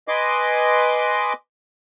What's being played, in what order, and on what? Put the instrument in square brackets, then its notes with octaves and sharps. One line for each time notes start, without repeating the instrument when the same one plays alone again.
[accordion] B4 D#5 G#5 C6 D6